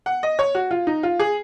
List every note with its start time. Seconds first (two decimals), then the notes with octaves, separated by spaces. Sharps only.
0.06 F#5
0.23 D#5
0.39 C#5
0.55 F#4
0.71 F4
0.87 D#4
1.03 F4
1.20 G#4